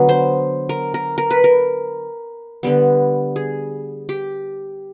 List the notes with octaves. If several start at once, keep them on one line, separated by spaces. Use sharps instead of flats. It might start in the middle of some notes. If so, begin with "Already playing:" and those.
Already playing: D3 F#3 B3
C5
A#4
A#4
A#4
B4
A#4
D3 G3 B3
G#4
G4